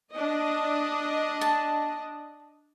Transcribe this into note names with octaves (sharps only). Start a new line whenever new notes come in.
D4 D#5
A5